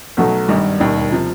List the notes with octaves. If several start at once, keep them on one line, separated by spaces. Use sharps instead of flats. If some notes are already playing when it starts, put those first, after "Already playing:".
B1 B2 F#3 A3
G#1 G2 D#3 G3
E1 D#2 D#3 G3
C3 F3